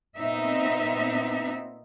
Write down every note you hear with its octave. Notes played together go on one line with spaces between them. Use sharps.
A#2 B3 C4 D#4 E5